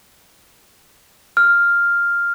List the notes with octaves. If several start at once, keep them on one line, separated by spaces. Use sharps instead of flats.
F6